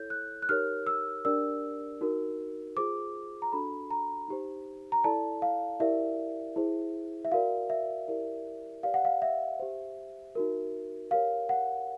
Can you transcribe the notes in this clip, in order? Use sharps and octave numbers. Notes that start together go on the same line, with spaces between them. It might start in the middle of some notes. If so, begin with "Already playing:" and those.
Already playing: E4 A4 C#5 G6
F#6
F#6
D#4 G4 A#4 C#5 F6
E6
D4 G4 A#4 D5 E6
D#4 F#4 A#4
F4 G#4 C5 D6
A#5
D4 F#4 A4 B5
A#5
D#4 G4 C5
A#5
E4 A4 D5 A5
F5
E4 G4 A#4 D5 E5
E4 G#4 C5
E5
F#4 A#4 D5 F5
E5
E4 G4 A#4 D5
G4 B4 D5 F5
F#5
F5
E5
G4 C5
D#4 F#4 A#4
G4 A#4 C#5 F5
F#5